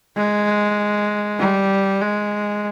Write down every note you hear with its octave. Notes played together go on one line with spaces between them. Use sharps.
G#3
G3
G#3